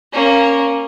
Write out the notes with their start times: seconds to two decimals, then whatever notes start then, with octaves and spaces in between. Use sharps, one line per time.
0.13 A#3 C#4